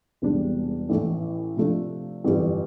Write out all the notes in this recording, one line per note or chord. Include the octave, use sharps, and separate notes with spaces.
E1 E2 C3 G3 D4
A1 A2 E3 A3
C3 F3 A3 D4
G1 F2 E3 G3